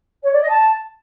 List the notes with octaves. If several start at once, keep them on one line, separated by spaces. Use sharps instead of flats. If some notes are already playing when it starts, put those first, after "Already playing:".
C#5
D5
D#5
A5